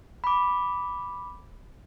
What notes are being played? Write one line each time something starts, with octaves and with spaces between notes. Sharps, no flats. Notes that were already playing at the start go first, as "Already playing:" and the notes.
B5 D6